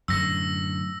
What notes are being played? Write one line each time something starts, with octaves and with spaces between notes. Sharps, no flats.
F#2 A2 D3 E6 A#6